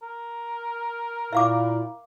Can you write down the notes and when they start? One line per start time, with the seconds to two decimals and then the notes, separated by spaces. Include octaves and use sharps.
0.02 A#4
1.33 A#2 E4 E5 F5 D6